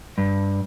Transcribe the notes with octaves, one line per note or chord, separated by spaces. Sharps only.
G2